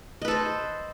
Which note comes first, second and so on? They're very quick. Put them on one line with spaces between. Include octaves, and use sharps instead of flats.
D#5 B4 A4 C5